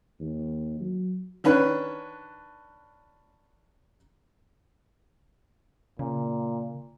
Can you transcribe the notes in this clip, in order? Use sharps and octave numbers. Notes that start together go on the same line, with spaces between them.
D#2
F#3
D#3 C#4 D4 B4
A#2 C#3